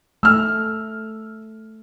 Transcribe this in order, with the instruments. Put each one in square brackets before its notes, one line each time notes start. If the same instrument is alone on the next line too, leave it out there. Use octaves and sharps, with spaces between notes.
[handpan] A3 [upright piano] E6 F6